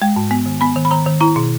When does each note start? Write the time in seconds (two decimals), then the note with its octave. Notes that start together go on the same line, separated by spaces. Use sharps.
0.02 G#3 G5
0.16 G#2
0.31 B3 G#5
0.46 D#3
0.61 B3 B5
0.76 D#3
0.85 B5
0.91 D#3 A#5
1.06 D#3
1.20 E4 A#5
1.36 B2